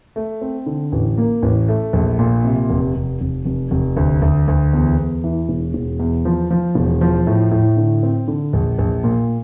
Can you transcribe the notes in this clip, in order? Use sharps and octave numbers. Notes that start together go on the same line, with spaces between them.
A3
C4
D3
A1
A#3
A1
A3
A#1
A#2
C3
F1
F1
F1
F1
F1
D2
D2
D2
E2
E2
E3
E1
E1
E2
F3
F3
E1
F3
A2
A2
D3
C4
D3
A#1
A#1
A#2